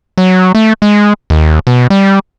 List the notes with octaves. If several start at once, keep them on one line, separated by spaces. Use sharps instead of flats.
F#3
A3
G#3
D#2
B2
G3